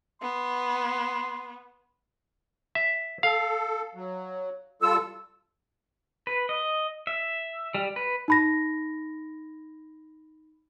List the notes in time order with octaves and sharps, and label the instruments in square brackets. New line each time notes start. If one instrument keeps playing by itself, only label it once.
[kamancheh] B3 [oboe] C6
[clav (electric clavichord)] E5
[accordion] A4 [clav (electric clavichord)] F5
[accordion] F#3
[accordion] G3 F4 A4 [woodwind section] E6
[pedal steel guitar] B4
D#5
E5
G3
B4
[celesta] D#4 B5 A#6